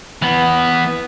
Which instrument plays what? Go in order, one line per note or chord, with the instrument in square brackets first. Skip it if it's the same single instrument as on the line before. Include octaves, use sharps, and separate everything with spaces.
[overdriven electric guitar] E3 B3